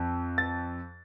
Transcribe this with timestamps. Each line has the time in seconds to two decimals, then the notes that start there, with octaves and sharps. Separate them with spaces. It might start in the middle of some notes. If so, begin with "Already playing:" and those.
Already playing: F2
0.38 A6